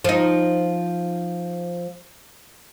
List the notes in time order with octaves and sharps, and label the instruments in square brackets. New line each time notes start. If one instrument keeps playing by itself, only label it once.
[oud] F3 D#4